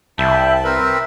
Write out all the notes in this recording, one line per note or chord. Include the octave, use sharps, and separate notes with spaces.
C2 E5 G5 A5 B5
C4 A#4 B4 E5